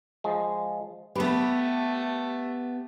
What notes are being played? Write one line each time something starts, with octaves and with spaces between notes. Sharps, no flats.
F3 G#3
A3 B3 G4 B4